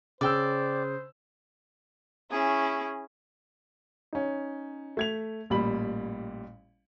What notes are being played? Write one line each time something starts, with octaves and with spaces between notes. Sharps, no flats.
C#3 C5 D5 G5 E6
C#4 E4 G#4
C#4 D#4
A3 G#6 F7
A1 A#2 G3 B5 F#7